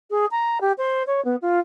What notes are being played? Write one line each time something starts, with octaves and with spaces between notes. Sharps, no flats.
G#4
A#5
G4
C5
C#5
B3
F4